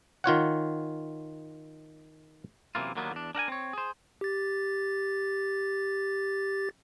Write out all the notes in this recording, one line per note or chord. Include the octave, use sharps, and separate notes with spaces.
D#3 F4 C#5 F#5
F#2 C3 E3 A#3 F4
D#2 D3 D#3 F#3 A#3 B3
E2 D4
D4 A#4 F#5 G#5
C4 C#5
G#4 C5
G4 A6